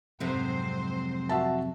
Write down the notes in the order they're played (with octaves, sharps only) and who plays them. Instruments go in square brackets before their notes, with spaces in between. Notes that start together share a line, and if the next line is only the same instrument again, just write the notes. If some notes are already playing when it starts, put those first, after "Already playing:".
[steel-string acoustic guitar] F2 C3 F#3 [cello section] G#2 C4 C5
[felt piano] F#4 E5 A5